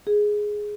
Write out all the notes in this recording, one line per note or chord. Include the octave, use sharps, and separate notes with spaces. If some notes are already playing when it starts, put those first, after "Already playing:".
G#4